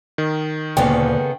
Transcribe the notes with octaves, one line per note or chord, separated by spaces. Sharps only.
D#3
D2 A#2 C#3 B3 A4 F5 G5